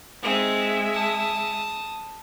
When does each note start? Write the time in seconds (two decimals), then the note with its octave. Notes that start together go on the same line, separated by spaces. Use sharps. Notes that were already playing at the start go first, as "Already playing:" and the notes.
0.22 G#3 C4 D#4 E5
0.92 A5 D#6